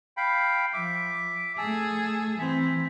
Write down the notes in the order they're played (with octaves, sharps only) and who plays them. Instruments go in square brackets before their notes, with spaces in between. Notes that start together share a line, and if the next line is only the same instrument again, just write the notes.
[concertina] F5 G5 B5
[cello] F3 [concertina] E5 D6
[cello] A3 G#4 [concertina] G#5 A5 E6
[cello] E3 C4 [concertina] E5